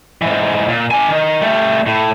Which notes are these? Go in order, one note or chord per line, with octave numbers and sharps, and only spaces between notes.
G#2 E3
A#2
D4 G#5
D#3
G3 A3
A2